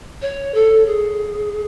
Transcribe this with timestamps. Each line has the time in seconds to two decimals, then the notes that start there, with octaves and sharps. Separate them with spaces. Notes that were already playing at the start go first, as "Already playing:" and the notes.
0.22 C#5
0.54 A4
0.86 G#4